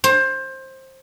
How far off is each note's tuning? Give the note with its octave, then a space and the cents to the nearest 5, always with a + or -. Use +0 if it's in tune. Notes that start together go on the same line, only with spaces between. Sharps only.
C5 +20